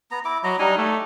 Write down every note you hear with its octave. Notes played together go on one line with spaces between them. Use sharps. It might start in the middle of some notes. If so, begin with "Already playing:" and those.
B3 A#5
E4 D6
F#3 D#5 A#5
G3 D4 D#4 G#5
A3 G4